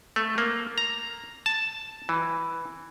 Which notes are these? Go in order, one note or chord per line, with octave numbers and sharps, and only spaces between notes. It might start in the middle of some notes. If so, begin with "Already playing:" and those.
A3
A#3
A#5
A5
E3